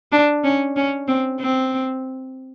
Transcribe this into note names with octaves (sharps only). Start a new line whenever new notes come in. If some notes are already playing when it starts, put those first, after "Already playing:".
D4
C#4
C#4
C4
C4